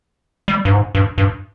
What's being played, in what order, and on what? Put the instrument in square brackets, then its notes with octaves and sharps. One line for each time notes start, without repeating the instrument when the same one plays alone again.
[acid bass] G3
G2
G#2
G2
G2